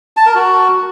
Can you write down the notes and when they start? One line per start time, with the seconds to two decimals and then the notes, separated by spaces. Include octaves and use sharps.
0.17 A5
0.26 A#4
0.35 F#4